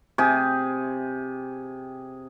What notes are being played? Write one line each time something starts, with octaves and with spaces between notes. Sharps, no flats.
C3 G#4